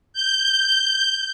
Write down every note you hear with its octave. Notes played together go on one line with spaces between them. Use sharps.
G6